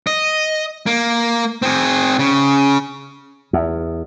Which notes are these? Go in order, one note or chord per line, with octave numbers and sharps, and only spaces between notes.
D#5
A#3
C4 G#4
C#3
E2